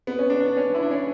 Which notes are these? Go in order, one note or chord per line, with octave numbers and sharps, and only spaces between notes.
B3
C#4
D4
D4
C#4
E4
D4
C#4